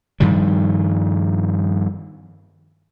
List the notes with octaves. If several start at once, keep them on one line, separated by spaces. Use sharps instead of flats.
G2 D#3 F3 G3